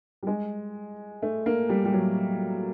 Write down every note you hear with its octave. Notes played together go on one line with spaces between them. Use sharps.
G3
G#3
A3
A#3
G3
G3
F#3